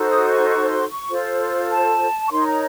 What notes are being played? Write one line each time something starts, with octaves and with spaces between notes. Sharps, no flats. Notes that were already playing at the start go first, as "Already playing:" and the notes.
Already playing: D#4 F#4 A4 C5
D#6
C#6
C#6
C6
C#6
F4 A4 C5
A5
C#6
D#4 A#4 C#5 C6
A#5